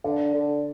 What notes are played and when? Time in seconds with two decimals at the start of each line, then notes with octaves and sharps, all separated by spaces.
0.04 D3 D4 D5
0.34 D3